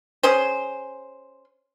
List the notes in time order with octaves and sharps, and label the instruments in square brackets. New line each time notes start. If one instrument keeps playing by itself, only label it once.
[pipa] C#4 G#4 C5